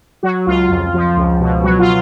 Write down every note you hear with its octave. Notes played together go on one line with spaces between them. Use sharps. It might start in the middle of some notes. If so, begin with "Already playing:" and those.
F#3 F#4
C#2 F4
F2
F3
C#2
B2
F#3 F#4
F4